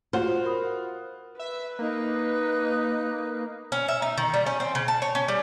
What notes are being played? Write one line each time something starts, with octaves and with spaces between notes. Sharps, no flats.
F4 F#4 C5
A#4 B5 D#6
B4 E5
A#3 D#4 F#6
C#4
E5
D#4
D#3
G3
C#4
C4
C#3
A5
C#5
C#4
G3